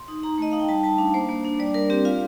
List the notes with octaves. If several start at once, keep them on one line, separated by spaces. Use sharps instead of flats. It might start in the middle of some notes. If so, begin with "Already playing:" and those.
Already playing: C6
D#4
D#4 A#5
A3 D#5
D#4 F5
G5
G3 A5
G3 A5
D4 F5
A#3 C5
A#3
D4
G3 D5
G3 A#4
C4 G4
F4 F5